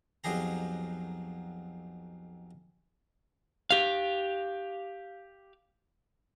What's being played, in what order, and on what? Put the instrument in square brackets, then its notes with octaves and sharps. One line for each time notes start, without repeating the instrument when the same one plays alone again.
[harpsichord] B1 F2 F#3 G4 G#4 A#5
[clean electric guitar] G4 F5